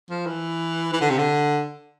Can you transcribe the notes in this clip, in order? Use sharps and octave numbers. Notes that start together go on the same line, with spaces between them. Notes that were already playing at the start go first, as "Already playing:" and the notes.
F3
E3
E3
D3
C3
D3